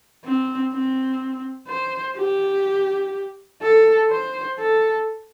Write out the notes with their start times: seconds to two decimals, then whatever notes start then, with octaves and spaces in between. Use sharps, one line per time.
0.25 C4
0.72 C4
1.69 C5
2.17 G4
3.62 A4
4.11 C5
4.59 A4